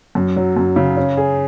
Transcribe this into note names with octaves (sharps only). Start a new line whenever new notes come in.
F#2
F#3
F#2
C#3
C#4
G#4